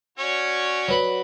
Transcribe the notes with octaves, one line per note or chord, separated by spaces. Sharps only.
C#4 F#4 C#5 D5
F#3 B4 B5